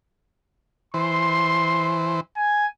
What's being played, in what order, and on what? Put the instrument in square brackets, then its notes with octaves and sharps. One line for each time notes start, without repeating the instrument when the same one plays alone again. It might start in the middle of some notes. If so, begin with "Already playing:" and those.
[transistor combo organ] E3 C5 [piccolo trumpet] C6
[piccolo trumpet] G#5